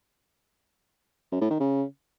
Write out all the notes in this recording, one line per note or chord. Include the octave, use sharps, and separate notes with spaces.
F#2
A2
D#3
C#3